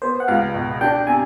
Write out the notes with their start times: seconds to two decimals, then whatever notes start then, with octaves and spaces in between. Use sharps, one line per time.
0.02 B3 C5
0.20 F#5
0.28 C#2 F5
0.54 B2
0.81 D4 G5
1.07 C3 G#5